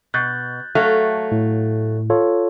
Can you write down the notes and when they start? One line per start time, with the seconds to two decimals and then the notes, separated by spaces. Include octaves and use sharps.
0.14 B2 F#6 G6 A6
0.75 F#3 A3 F5
1.32 A2
2.10 F4 A4 C#5